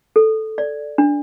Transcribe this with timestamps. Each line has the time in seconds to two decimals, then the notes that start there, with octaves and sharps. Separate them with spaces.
0.16 A4
0.58 D5
0.98 D4